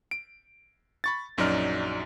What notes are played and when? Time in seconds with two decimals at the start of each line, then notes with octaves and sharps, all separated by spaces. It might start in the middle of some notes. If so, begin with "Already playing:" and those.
0.11 D7
1.04 B5 C#6 A6
1.38 A#1 F#2 F#3 D#4 D5 F6